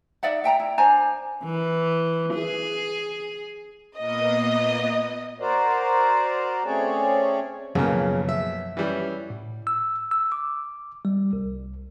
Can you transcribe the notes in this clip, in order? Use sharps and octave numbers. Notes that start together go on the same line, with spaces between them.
D#4 D5 E5 F#5
E5 G5 A5 A#5
E4
D4 C5 G#5 A#5
E3
G#4
A#2 A#3 B3 D#5
F#4 A#4 C5 D5
A3 C4 C#4 G#4 C#5 D5
B1 F#2 A#2 C#3 F3 F#3 A#3
E5
E3 G3 C#4
A2
E6
E6
D6
G3
C2